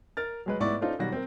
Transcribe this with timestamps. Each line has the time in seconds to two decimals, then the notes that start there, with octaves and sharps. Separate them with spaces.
0.17 A#4 F6 A6
0.46 F#3 G#3 B4
0.60 A1 G#2 B3 E4 D5 C#6
0.81 C#4 D#4 F4 A4 C5 D5
0.99 B2 D#3 F#3 G3 F#4 A#6
1.12 C4 A#4